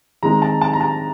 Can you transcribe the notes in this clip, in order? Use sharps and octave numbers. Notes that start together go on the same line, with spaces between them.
D#3 G#3 C4 D#4 A#5
A5
A5
A#5
A5